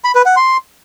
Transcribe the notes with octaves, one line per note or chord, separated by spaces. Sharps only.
B5
B4
F#5
C6